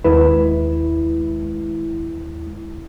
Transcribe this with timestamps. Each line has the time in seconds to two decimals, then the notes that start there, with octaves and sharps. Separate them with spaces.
0.04 D#2 G#3 E4 B4